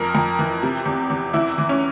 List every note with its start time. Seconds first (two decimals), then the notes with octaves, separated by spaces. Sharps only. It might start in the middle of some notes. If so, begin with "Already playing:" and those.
Already playing: F2 A#4
0.15 F2
0.39 E3
0.63 C3
0.86 E2
1.10 E2
1.33 E3 E4
1.58 E3
1.69 C#4